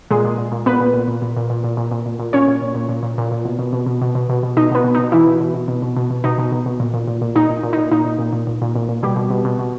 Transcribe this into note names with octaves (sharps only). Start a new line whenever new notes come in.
A#2 G#3 G#4
A#2
A#2
A#2
A#2 B3 B4
A#2
A#2
A#2
A#2
A#2
A#2
A#2
A#2
A#2
A#2
A#2
A#2 C#4 C#5
A#2
A#2
A#2
A#2
A#2
A#2
A#2
B2
B2
B2
B2
B2
B2
B2
B2
B2 D#4 D#5
B2 B3 B4
B2
D#4
B2
B2 E3 E4
B2
B2
B2
B2
B2
B2
B2
B2 D#4
B2
B2
B2
A#2
A#2
A#2
A#2
A#2 D#4
A#2
A#2
D#4
A#2
A#2 D#4
A#2
A#2
A#2
A#2
A#2
A#2
A#2
B2 G3 G4
B2
B2
B2
B2